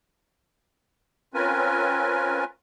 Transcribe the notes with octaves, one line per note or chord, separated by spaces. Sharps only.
C4 C#4 F4 A#4 B4 G#5